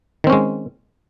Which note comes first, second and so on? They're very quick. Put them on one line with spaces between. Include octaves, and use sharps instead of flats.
D#3 C4 C#4 G#3